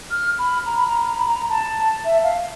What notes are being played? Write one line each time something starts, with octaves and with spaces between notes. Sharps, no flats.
F6
B5
A#5
B5
A#5
B5
A#5
B5
A#5
A5
E5
F5